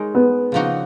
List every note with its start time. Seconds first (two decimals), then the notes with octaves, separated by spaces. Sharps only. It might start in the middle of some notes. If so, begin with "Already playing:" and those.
Already playing: G#3 D#4 A#4 C#5
0.15 B3
0.52 C#3 F3 A#3 D#4 F#4